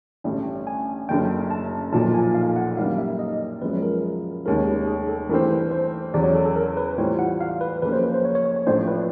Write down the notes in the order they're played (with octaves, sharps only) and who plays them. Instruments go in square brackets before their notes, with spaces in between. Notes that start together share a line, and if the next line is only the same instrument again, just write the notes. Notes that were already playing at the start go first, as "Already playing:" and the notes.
[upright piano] A1 G2 D3
[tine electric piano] G#5
[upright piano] F#1 F#2 D3 [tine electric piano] G5
[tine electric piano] A5
[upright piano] B1 A#2 F3 [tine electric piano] A5
[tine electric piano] G#5
F5
F#5
[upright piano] F#2 D#3 G3 A#3 D4 [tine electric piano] F5
[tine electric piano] E5
D#5
[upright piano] F#2 C#3 F3 G#3 B3 [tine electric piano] B4
[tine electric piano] A#4
[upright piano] F1 D#2 D#3 G#3 C#4 [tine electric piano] A#4
[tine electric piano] G4
G#4
A4
[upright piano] G2 E3 A3 C4 [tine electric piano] A#4
[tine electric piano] B4
C5
[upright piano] E2 C#3 F#3 [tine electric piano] D5
[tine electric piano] C#5
A4
A4
A#4
B4
[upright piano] A2 E3 G3 C4 F4 [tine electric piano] C#5
[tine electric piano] F#5
F5
B4
[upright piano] F2 C#3 F#3 A#3 C#4 [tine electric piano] B4
[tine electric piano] C5
B4
C5
C#5
C#5
C#5
C#5
[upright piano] A1 A2 F3 A3 D4 [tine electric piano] C5
[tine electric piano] B4